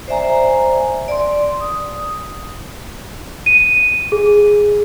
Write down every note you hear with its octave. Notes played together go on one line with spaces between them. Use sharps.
C5 D5 E5 G#5 A#5
D5 C6
D#6
D#7
G#4